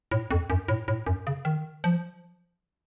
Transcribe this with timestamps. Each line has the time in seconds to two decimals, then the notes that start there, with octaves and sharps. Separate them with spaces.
0.11 A2
0.31 F2
0.50 F#2
0.68 A2
0.88 A2
1.07 F#2
1.27 C#3
1.45 D#3
1.84 F3